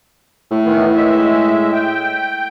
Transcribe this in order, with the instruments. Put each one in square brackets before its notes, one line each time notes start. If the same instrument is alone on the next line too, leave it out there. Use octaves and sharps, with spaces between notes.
[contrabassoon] A2
[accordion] D#3 E3 B3
G#3 E5
G5